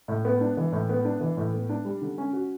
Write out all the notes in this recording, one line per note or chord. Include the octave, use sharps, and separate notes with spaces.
A2
B3
D4
E3
A2
B3
D4
E3
A2
B3
D4
G3
D3
C#4
F#4